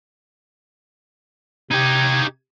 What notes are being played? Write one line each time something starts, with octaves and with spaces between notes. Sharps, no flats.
C3 D#4 G4 G#6